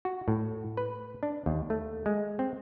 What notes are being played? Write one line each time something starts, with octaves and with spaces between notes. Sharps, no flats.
F#4
A2
B4
D4
D#2
A3
G#3
C4